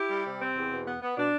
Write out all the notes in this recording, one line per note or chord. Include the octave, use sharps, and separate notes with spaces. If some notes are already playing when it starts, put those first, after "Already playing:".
Already playing: E4 G4
G3
C3
C4
E2
B2
B3
B3
B2 D4